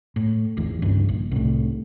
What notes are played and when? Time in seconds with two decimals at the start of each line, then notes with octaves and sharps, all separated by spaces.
0.16 A2
0.57 G#1 E2
0.82 C#2 G2
1.09 A#1
1.32 C2 A2